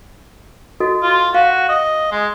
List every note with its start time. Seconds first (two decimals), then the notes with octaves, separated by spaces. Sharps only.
0.80 F#4 A4 D#5
1.03 F4
1.34 F#4 F5
1.69 D#5
2.12 G#3